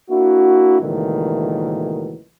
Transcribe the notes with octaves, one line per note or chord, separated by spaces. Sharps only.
A#3 D4 E4 F#4
C#2 A#2 D#3 E3 F#3 A3